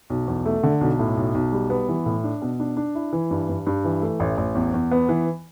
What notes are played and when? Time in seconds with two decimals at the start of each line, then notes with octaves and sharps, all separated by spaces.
0.10 B1
0.28 E2
0.46 A3
0.63 D3
0.81 B1
0.99 A2
1.17 B1
1.34 B1
1.52 G3
1.70 B3
1.88 E3
2.06 A2
2.24 D4
2.42 B2
2.60 D4
2.77 D4
2.95 E4
3.13 E3
3.31 G2
3.49 G2
3.67 G2
3.84 E3
4.02 A3
4.20 A1
4.38 A1
4.55 E2
4.74 E2
4.92 B3
5.09 E3